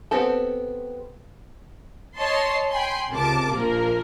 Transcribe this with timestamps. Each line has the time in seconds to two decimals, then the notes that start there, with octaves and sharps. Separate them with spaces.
0.11 B3 C4 G4 A4
2.17 C#5 D#5 A5 C6
2.71 G5 G#5 B5 C6
3.11 C#2 C3 A#4 A5 D6
3.53 A#1 F3 A#3 A#4